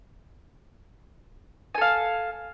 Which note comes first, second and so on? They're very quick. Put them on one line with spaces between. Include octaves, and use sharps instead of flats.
G#5 A4 F5